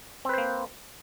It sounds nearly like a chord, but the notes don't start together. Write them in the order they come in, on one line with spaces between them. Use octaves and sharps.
C4 B4 C5 A#3